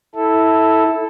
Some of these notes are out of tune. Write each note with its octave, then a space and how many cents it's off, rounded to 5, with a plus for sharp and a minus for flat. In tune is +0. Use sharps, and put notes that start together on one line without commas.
E4 -15 A4 +0